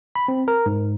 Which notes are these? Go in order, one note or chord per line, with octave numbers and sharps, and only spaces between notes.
B5
C4
A#4
G#2